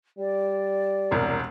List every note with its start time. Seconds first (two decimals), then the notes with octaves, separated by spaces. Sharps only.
0.18 G3 D5
1.11 E1 C2 A#4